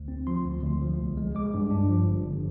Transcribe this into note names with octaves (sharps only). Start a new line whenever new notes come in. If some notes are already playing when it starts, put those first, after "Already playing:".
Already playing: D2
C4
F3 C6
D2
D2
F3
C2
G#3
G#3 D6
G2
D4
F3
G1
G1